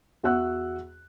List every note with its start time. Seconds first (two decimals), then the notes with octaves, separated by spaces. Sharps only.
0.23 E2 F#4 E5 F#5 E6 F#6